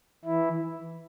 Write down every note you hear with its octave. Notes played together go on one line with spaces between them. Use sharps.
E3 E4